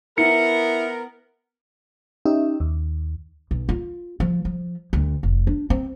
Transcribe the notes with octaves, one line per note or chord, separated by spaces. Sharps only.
B3 E4 A#4 C#7
C#4 D#4 G4 E5
D#2
B1
F4
F3
F3
D2
F1
D4
C4